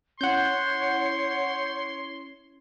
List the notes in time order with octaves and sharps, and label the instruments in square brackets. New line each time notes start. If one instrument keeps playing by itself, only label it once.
[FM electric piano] C#4 E4 [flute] C#5 [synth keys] F#5 G6 [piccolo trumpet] C6